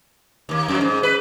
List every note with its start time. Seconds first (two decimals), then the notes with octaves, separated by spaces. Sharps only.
0.49 D#2 A#3
0.68 F2 F#3
0.81 G#2
1.03 B4